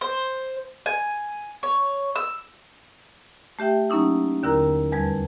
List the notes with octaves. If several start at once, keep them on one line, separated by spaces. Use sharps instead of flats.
C5
G#5
C#5
E6
A3 G4 E5 G5
F#3 A#3 C#4 D#4 E4
D#2 D3 E4 A#4 A#5
E2 G3 B4 A5 G#6